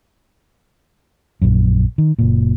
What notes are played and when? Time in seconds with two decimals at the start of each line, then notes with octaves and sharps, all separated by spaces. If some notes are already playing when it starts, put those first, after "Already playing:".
1.42 A#1 F#2
1.98 D#3
2.19 F#1 A#2